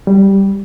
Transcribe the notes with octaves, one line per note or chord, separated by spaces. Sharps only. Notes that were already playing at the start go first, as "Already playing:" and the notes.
G3